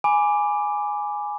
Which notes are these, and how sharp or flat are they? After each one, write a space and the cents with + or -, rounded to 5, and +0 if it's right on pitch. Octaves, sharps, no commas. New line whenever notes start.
G#5 +0 B5 +0 D6 +0